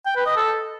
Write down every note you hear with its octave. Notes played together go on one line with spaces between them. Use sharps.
G5
B4
D#5
A4